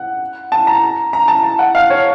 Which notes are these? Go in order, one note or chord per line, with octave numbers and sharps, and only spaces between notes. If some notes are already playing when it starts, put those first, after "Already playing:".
Already playing: F#5
A5
A#5
A#5
A5
A5
F#5
F5
C#5